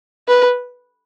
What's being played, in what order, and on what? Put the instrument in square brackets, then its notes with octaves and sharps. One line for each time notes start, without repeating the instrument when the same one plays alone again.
[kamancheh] B4